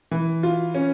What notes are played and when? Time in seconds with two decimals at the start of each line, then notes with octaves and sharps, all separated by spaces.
0.11 E3
0.43 F4
0.75 C#4